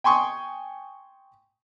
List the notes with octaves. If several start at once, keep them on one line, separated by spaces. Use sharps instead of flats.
G5 G#5 C6 C#6 D#6